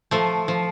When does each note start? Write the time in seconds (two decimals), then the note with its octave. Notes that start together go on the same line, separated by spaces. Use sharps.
0.11 F3 A3
0.48 F3